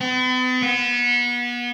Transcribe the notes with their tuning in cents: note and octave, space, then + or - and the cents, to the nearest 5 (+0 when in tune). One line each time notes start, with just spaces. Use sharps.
B3 +45
B3 -30